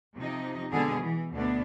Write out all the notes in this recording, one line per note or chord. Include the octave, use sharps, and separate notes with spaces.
C3 F3 D#4
B2 D3 G#3 B3 G#4
E3
D2 B2 B3 D4